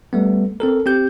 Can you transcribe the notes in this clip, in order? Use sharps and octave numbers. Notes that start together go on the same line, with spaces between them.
G3 A3 B3
C4 A4 A#4
C4 G4 G6